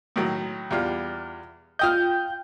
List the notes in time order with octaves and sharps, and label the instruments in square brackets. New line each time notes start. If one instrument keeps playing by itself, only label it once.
[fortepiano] A2 D#3 F#3
E2 G3 F4
[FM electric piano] F4 G5 G6 [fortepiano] D#5 D#6 F6